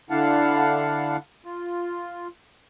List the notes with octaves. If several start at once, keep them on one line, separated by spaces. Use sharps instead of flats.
D3 D4 E4 F5 F#5 A5
F4